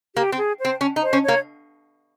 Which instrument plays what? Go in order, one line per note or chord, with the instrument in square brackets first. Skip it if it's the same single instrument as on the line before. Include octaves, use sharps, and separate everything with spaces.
[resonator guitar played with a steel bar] A#3 [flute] G4
[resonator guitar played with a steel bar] C4
[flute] G#4
C5
[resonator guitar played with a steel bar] C4
C#4
D#4
[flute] C5
[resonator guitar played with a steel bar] C#4
[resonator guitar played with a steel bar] A#3 [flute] C#5